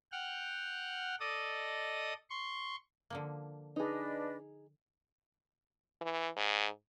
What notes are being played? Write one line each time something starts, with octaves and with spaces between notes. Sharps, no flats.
F#5 G5 F6
A4 D5 D#5 D#6
C6 C#6
D3 F3 A#3
D4 D#4 G#4 B4 D#5
E3
G#2